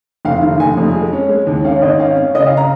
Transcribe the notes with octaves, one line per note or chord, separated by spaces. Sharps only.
F1 F5
D#3
F1 G#5
F2
G#3
C#4
G#3
D#2
C#4 F5
G#1 D#5
C#4 F5
C#4
C#3 D#5
F5
A#5